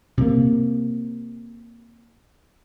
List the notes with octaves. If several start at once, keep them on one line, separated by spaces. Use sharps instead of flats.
C3 A#3